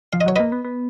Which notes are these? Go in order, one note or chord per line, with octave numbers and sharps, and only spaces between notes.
F3 F5
D#5
F#3 C#5
A#3 B4 D#5
B3
B3